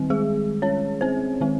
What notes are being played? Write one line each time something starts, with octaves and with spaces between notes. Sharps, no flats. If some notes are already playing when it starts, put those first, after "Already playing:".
Already playing: D#3 G3 C4
G#3 G#4
C#4 C#5
C4 C5
D#3 G#3 C4